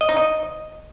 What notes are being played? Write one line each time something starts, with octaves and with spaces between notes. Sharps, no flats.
D#5
D#4
D#5